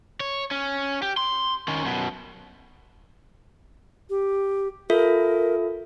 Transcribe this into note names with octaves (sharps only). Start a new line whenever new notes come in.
C#5
C#4
G4
C6
D#3 C#4
F#2 B2
G4
F4 A4 A#4 E5